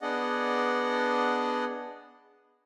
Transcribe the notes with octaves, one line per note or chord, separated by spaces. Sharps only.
B3 D4 G#4 D5 D#5 F#5